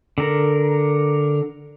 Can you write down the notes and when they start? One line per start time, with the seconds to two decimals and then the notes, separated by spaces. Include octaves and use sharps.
0.18 D3 A#4